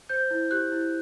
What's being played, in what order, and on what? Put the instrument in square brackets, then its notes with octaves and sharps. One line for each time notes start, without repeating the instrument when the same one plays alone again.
[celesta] C5 G6
E4
G4 F#6
E4